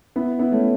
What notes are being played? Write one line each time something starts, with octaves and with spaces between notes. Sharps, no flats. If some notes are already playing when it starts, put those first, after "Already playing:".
B3 E4
B3 E4
A3 C#4